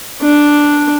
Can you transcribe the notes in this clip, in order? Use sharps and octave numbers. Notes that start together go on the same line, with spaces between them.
D4